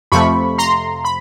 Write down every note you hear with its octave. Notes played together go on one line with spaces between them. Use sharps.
F2 C3 F3 A3 B5 C#6
A#5 C6
B5